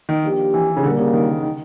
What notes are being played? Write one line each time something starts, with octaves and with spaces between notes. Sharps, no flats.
D#3
F3 A#3 D4 G4
E3
C#3
A#2 D3 G3 A#3
C#3
D#3
D#3